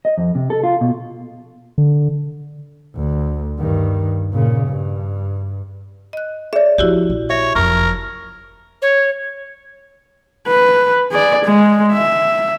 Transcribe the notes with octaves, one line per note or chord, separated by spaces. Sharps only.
D#5
F2
C3
A4
F4
B2
D3
D2
G2 D#3
A#2 C#3
G2
D#5 F#6
G#4 C#5 D5 E5
E3 F3 E4 F#4 G4
A#1
C#5 E5
F#1 F2 A#4 C#6
C#5
B4
G#4 D5
G#3
E5